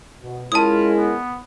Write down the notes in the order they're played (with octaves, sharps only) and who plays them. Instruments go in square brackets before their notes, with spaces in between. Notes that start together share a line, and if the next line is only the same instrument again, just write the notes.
[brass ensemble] B2
[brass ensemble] G#3 [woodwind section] C#4 E4 A#4 [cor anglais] F4 [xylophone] A5 D#6
[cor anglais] B3